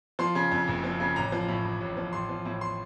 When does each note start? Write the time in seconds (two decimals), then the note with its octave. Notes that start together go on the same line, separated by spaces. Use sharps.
0.19 F3 C6
0.35 C#3
0.52 F2
0.68 F#1
0.84 F3
1.00 C#3
1.16 A1 A#5
1.32 F3
1.49 A2
1.65 A1
1.80 A1
1.97 F3
2.13 A1 C6
2.29 F3
2.45 A2
2.61 C6